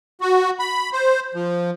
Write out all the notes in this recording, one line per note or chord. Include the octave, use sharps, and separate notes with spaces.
F#4
B5
C5
F3